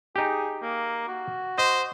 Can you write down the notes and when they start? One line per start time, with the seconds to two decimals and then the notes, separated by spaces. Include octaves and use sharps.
0.16 D#4 G4 G#4
0.62 A#3
1.08 F#4
1.58 C5 D#5